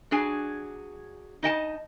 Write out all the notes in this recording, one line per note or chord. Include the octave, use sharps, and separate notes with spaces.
F#3 D4 G#4 G#5
D#4 D#5 G5 A5